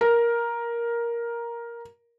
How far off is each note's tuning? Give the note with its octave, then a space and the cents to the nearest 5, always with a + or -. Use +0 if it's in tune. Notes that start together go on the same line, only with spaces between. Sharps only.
A#4 +10